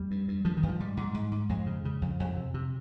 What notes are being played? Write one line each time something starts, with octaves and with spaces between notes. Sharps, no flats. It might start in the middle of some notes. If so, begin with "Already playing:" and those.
Already playing: F2 G3
G2
G2
G2 F3
D#3
G2
F3
G#2 G3
G#2
G#2
G#2
F2 G#3
C#3
C#3
F2
F2
C3
C3